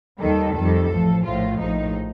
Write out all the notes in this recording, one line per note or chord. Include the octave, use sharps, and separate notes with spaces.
D#2 D#3 G3 A4
F2 D#3 G3 A4
A1 A2 F3
A#1 A2 F3 F4
A#1 A2 F3 D#4